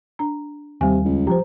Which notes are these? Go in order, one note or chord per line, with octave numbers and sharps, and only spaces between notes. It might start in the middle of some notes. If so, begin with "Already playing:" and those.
D4 A#5
D#2 C3 G3 G#5
C#2
F3 G4 C5 A#5